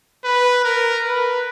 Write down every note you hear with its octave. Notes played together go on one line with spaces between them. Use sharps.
B4
A#4
B4